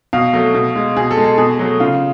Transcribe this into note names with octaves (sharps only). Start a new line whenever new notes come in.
B2 F5
F#3 A3
B2
G#3
B2 G#4
A4
G#3
A4
B2 G#4
F#3 A3
C#3 F4